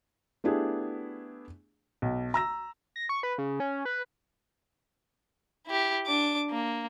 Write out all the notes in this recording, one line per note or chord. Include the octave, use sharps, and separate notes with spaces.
A3 B3 D4 E4 G4 G#4
B1
A#5 E6 A#6
A#6
C#6
B4
C#3
C#4
B4
E4 G4
D4 D6
A#3